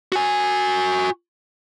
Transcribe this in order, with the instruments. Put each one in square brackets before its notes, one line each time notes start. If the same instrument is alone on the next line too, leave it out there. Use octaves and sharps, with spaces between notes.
[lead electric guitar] F#4 G#5